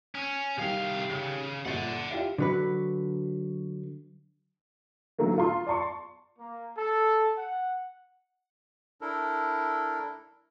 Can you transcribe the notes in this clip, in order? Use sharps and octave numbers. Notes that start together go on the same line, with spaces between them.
C#4
C2 D#3 G3 F5
C#3
G1 A#2 D5 F#5
E4 F4 G4
D3 F#3 B4
D3 D#3 F#3 A3 A#3
F4 C6
D5 A5 C6 C#6
A#3
A4
F#5
D4 E4 A4 A#4